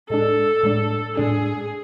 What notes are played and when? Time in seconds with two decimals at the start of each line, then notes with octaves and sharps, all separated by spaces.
0.09 A2 G#3 D4 A4
0.63 A2 G#3 D4
1.17 A2 G#3 D4 G#4